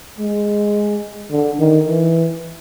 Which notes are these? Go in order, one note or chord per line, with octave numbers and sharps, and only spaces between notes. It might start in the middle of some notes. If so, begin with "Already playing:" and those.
G#3
D3
D#3
E3